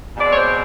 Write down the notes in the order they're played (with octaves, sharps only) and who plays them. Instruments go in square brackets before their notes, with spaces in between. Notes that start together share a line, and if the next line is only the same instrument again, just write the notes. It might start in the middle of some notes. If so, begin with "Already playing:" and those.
[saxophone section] B2 G#3 C4 D5
C#5
C5